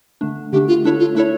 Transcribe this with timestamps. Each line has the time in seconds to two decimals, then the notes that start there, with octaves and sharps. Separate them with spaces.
0.21 D3 A3 D4
0.52 D3 A3 D4 G4
0.68 F4
0.84 A3 D4 E4 A4 C#5
0.99 F4
1.15 A3 D4 E4 A4 C#5